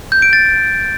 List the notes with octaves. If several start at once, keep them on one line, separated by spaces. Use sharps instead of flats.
G6
D7
A6